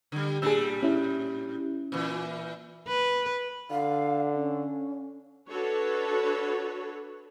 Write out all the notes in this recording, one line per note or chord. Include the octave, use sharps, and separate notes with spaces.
D3 G3
A2 G3 D4 G#4 E6
C#4 E4
A#2 E3
B4
D3 F5
C#4
D4 F#4 A4 B4 C#5